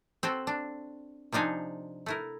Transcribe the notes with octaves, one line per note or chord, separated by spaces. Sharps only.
C4 F#4 A4 C5
D4
C3 F3 D4 D#4 G#5
A3 E4 A#4